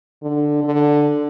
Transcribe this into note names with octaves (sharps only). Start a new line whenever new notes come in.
D3
D3